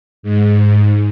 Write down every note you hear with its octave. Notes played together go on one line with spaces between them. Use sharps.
G#2